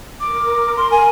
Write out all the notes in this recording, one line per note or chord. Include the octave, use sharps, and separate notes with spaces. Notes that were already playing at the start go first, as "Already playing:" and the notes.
A#4 D6
C6
G#5